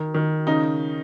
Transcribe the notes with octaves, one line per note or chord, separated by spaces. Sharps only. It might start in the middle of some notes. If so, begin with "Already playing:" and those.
Already playing: D#3
D#3
C#3 D#4